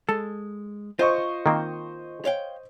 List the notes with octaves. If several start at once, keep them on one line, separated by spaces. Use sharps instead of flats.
G#3 A4
F4 C5 D#5 C#6
D#3 A#3 C4
C#5 F5 G5